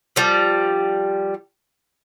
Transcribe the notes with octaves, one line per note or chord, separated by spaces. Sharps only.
F3 G3